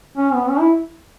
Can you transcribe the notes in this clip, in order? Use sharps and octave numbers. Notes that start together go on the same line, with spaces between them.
C#4
B3
C#4
E4